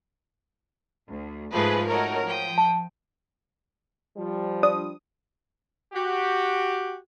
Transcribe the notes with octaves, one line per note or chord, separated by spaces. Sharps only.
D2
G#2 F3 A3 G#4 B4
A3 D#4 F#4 A#4 C#5
F3 G5 D#6
A5
F3 G3
D4 D#6
F#4 G4